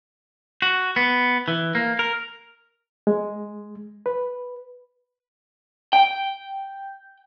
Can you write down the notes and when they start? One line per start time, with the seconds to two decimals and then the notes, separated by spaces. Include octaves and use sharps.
0.62 F#4
0.96 B3
1.48 E3
1.75 A#3
1.99 A#4
3.07 G#3
4.06 B4
5.93 G5